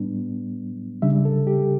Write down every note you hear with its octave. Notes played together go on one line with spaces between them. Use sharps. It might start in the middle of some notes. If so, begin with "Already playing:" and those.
Already playing: A2 G3 B3 D4
C#3 G3 D4 E5
A4
G4